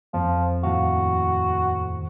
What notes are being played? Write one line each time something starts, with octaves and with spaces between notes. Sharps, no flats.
F2 F3
D#2 A2 F#4 F5